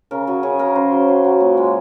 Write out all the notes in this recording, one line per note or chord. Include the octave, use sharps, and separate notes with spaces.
C#3 A#4
F#3 G#4
C#3 G#4
F#3 A#4
C#3 C5
F#3
F#3
F#3
A#2
G#3